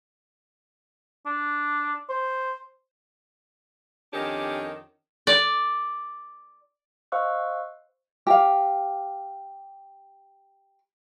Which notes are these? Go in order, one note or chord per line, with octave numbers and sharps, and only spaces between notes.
D4
C5
F2 D#3 C#4 D4 G4
D5
C5 D#5 F5 C#6 E6 F#6
G4 F5